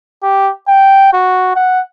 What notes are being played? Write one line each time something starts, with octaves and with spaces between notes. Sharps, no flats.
G4
G5
F#4
F#5